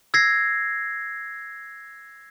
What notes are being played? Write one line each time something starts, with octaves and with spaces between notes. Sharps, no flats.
E6 G#6 A#6 C7